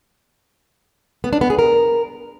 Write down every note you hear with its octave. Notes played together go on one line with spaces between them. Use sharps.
B3
D4
B3
G#4
A#4